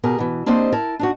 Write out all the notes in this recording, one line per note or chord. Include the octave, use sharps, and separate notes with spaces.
B2 G4 G#4 A#4
B2 E3
A#3 C4 D4 G4 C5 D#5
E4 A#4 A5
D4 D#4 F#4